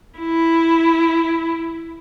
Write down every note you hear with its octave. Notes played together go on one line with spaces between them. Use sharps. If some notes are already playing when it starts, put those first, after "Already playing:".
E4